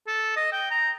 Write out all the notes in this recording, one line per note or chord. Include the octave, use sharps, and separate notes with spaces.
A4
D#5
G5
A#5